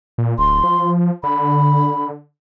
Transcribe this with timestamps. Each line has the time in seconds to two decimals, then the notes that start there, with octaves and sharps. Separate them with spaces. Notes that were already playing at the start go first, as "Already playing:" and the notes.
0.18 A#2
0.38 D1 C6
0.63 F3
1.23 D3 B5